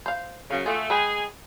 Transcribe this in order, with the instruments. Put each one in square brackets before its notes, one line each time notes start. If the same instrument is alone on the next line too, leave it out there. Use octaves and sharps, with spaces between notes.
[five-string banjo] C5 F5
[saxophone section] F#2 C#3 [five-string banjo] F5
[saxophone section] A3 [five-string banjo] F4 F#4 G#4
[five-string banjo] G#3 B4 G5 [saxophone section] G#4